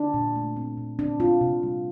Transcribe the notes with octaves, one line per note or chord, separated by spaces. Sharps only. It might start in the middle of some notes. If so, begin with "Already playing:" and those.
Already playing: D4
A#2
A3
C4
A#2
C4 D4
C4 F4
C3
G3